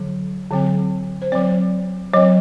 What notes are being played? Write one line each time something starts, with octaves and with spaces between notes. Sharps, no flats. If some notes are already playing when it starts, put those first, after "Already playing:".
Already playing: D3 F#3
D3 F#3 C4
C5
F#3 C4 D5
F#3 C4 D#5